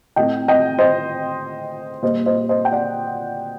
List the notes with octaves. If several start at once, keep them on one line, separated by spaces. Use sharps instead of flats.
A2 A3 C4 D#5 G5
D#5 G5
C5 D#5
A#2 G3 A#3 C5 D#5
C5 D#5
C5 D#5
G5
D5 F#5